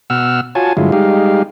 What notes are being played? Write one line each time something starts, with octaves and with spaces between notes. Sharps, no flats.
B2 F#5 E6 F6
F4 F#4 C#5 G#5 A5
G2 D3 F#3 G#3 E4 F4
G3 G#3 D#4 G4 F5